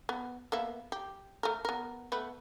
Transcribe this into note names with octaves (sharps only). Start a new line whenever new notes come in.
B3
A#3 B3 E5
G4
A3 A#4
B3 A#4
A3 B3 B4